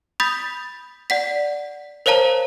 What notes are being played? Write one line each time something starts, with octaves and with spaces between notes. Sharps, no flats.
B5 D#6 G6 A6 B6
D5 F#5 B6
A#4 C5 C#5 F5 A5 A#5